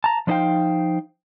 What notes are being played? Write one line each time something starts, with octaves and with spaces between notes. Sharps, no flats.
A5 A#5
F3 D4 D#4 C5 F5 G5